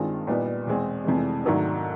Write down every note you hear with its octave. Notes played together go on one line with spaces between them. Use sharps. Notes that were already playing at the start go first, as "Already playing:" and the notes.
Already playing: G2 D#3 G#3 C4 F4
A#2 G3 B3 D#4
E2 B2 G#3 C4
F1 F2 C3 E3 G#3
G#2 D#3 F#3 A3 D4